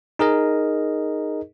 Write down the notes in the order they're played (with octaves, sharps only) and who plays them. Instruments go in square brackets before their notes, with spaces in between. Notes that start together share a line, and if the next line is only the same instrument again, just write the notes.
[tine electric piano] D#4 G#4 A#4 D#5